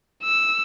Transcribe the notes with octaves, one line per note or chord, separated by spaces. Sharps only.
E6